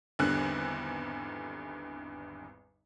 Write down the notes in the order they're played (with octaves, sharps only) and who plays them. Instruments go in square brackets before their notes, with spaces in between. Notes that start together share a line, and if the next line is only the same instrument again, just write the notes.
[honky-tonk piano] G#1 E2 D3 G3 F#6